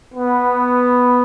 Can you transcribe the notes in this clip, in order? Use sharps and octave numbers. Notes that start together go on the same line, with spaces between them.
B3